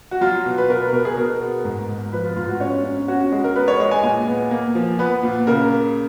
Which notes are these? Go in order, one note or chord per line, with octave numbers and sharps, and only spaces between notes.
F#4
F#3 F4
B2
B4
B2 A#4
B4
B2 A#4
G#4
B2 A#4
B3
G#2
G#2
F3 B4
F4
G#2 F4
F#4
C#4 C#5
C#4
C#4 F#4
F#4
G#3
A#4
B3 B4
C#5
G#3 D#5
G#5
A#2 G#5
B3
A#3
F3
B3 B4
A#2
C#3 A#4